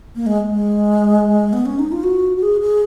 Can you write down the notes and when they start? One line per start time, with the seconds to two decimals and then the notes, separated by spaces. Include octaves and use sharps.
0.16 A#3
0.26 G#3
0.50 G#3
1.53 B3
1.66 C#4
1.79 D#4
1.92 F4
2.03 F#4
2.37 F#4
2.42 G#4
2.61 G#4